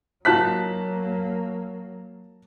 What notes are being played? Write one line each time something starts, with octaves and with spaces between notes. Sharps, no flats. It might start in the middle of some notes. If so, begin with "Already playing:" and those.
F#3 A#3 D#4 F4 F#4 A5 F#6 B6